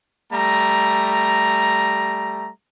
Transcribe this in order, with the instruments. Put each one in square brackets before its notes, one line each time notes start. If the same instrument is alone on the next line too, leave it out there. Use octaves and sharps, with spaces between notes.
[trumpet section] G3 A3 A#5